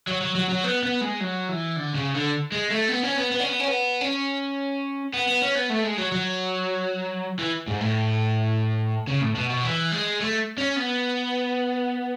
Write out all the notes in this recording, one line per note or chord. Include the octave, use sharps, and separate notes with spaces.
F#3
F#3
F#3
F#3
B3
B3
G#3
F#3
E3
D3
C#3
D3
G#3
A3
B3
C#4
B3
B3
C#4
B3
C#4
B3
C#4
B3
B3
C#4
B3
A3
G#3
F#3
F#3
E3
G#2
A2
C#3
A2
B2
B2
E3
G#3
A3
C#4
B3